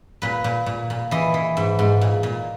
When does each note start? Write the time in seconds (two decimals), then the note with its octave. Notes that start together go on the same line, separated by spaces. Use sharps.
0.22 A#2 B4
0.44 A#2
0.66 A#2
0.90 A#2
1.11 E3 D#5
1.34 E3
1.57 G#2
1.79 G#2
2.01 A#2
2.23 A#2